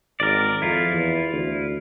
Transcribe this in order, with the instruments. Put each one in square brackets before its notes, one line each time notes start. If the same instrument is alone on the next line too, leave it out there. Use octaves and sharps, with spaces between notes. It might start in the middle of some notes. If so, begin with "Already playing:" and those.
[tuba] G#1 [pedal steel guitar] A#4 D5
[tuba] F2 [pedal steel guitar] E4 F4
[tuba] E2
D2